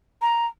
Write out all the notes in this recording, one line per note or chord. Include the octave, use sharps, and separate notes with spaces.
A#5